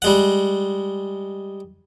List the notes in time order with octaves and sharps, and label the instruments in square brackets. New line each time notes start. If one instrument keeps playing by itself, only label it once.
[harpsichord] G3 G#3 F#5